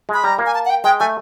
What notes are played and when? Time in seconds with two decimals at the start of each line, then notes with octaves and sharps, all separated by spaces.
0.09 G#3 B5
0.24 G3 A#5
0.39 A#3
0.46 G#5
0.54 A5
0.65 F#5
0.70 G5
0.84 G#3 G5
1.00 A3 G#5